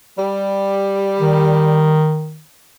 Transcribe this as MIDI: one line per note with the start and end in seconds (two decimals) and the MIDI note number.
0.17 2.07 55
1.20 2.42 51